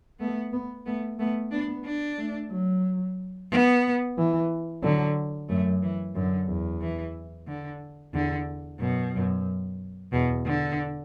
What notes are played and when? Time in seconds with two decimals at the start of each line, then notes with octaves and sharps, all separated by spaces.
0.20 A3 B3
0.53 B3
0.86 A3 B3
1.19 A3 B3
1.51 B3 D4
1.85 D4
2.18 A3
2.51 F#3
3.51 B3
4.18 E3
4.83 D3 F#3
5.49 F#2 A3
5.82 E3
6.15 F#2 D3
6.48 E2
6.81 E3
7.48 D3
8.14 E2 D3
8.80 F#2 B2
9.14 F#2
10.12 E2 B2
10.46 D3